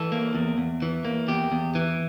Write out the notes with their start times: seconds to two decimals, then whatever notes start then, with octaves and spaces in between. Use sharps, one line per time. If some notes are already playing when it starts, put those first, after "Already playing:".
Already playing: E3 A4
0.12 A#3
0.35 E2
0.58 E2
0.82 E3
1.05 A#3
1.28 E2 G4
1.52 E2
1.75 E3